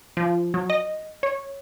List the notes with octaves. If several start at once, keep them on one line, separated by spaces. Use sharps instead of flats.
F3
F#3
D#5
C#5